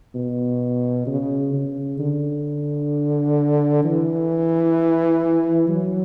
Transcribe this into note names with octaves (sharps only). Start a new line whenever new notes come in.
B2
C#3
C#3
D3
E3
F#3